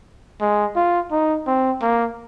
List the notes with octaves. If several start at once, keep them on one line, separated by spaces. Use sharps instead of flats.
G#3
F4
D#4
C4
A#3